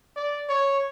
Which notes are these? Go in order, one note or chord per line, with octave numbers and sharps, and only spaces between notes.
D5
C#5